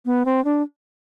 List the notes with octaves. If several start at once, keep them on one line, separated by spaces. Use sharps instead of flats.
B3
C4
D4